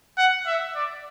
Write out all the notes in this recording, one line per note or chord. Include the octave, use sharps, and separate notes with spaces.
F#5
E5
D5